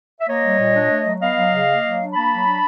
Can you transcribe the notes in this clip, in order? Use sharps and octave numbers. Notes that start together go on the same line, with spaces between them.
E5
A#3 C#5 D#5
G3
A#2
D4
A3
F#3
B3 D#5 F5
F#3
C#3
A#3
F#3
D4
A#3 A5 B5
F#3
D4